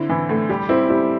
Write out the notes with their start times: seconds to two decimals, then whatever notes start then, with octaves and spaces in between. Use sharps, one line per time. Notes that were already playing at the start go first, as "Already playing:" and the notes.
Already playing: D3 C4 E4
0.09 E3
0.29 A2
0.49 G3 G4
0.69 C4 E4
0.89 G3 E4